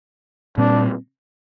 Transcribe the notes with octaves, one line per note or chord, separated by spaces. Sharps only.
A#2 G3 C4 D4